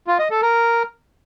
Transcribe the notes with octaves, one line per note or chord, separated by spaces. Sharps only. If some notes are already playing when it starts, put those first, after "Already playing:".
F4
D#5
A4
A#4